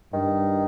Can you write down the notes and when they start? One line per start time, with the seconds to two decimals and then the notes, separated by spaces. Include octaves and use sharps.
0.13 G2 D#3